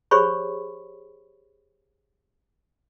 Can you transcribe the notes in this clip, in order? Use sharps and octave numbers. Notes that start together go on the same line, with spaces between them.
G4 G#4 C5 C#5 B5 C#6